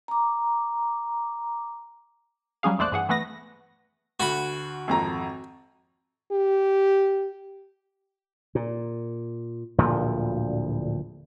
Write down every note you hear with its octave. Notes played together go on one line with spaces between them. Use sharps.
A#5 D6
F#3 G3 C#4 G#4 F5
A1 D#2 A3 C5 D5 F#6
G2 E3 G#4 F#5
E3 A3 B3 B4 A#6
D2 F#4 B5
G#1 F2 A#5
G4
A#2
D1 D2 A#2 F3